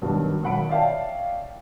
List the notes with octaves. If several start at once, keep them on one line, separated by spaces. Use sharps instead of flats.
G2 B2 D#3 F#3
B1 D#3 F#5 B5 D7
C#5 D5 E5 F5 G5 A5